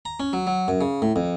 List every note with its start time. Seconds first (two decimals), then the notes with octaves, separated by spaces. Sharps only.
0.05 A#5
0.20 C#4
0.33 F#3
0.47 F#3
0.68 F#2
0.81 C#3
1.02 A2
1.16 F2